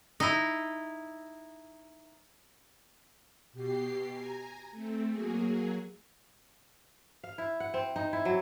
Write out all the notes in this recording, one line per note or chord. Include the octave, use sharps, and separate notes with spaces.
D#4 E4
B2 G4 C7
G#5 A#5
A3 C4
F#3 A#3 G#4
F5
E4
F#5
C4
D#4
E4
F#3